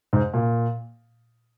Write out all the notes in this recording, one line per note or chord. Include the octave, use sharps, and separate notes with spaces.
G#2
A#2